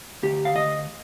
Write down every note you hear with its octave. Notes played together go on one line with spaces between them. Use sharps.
D2 G4
F5
D2 D#5